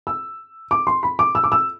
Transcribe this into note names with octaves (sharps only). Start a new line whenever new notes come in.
E6
D6
C6
B5
D6
E6
D6
E6